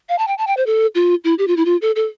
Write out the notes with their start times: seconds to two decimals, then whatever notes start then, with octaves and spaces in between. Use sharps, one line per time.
0.09 F5
0.19 A5
0.28 G5
0.38 A5
0.47 G5
0.57 C5
0.66 A4
0.95 F4
1.24 E4
1.39 G4
1.48 F4
1.57 E4
1.65 F4
1.82 A4
1.96 A4